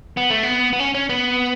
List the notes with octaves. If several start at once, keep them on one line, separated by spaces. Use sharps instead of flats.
B3
A3
B3
B3
C#4
C#4
B3